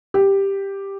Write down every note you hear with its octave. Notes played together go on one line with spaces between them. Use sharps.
G4